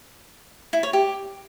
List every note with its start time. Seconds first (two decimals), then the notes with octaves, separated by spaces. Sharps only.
0.73 E4
0.83 C#5
0.93 G4